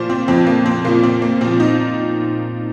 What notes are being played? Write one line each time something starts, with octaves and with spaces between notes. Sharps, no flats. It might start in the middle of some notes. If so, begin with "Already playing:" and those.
Already playing: A#2 F3 C5
C4
F2 F3 C4
A#3
C4
A#2 F3 A#3
C4
A#3
A#2 F3 C4
D#4